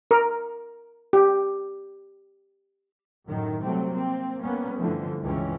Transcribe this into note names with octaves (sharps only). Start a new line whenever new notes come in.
A#4
G4
F#2 A2 D#3 F#3
C3 F#3 G3 A3 C4
A#3 C4
G3 A#3 B3 C#4
G2 D3 E3 F3 A3
C#2 G2 C3 E3 C4 C#4